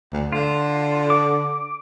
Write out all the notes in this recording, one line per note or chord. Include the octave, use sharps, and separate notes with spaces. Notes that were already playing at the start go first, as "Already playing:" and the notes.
D2
D3 F4
D6